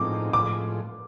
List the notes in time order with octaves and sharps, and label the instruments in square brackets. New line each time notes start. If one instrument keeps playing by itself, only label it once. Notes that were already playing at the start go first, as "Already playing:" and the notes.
Already playing: [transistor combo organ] A2 F3 G#3 C4 D#4 [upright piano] D6
[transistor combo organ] A2 F3 G#3 [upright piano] D6